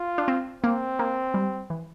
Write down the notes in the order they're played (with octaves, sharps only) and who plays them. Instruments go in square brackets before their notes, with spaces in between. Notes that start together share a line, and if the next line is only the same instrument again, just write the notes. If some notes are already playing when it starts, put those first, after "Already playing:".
Already playing: [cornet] F4
[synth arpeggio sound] D4
C4
[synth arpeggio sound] A#3 [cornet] C4
[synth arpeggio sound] A#3
G3
E3